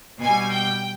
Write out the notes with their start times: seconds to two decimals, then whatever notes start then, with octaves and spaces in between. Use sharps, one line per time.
0.21 B2 G3 G#5
0.52 G5